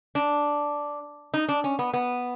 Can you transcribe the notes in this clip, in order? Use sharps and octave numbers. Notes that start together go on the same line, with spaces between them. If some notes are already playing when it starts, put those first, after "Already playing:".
D4
D#4
D4
C#4
B3
B3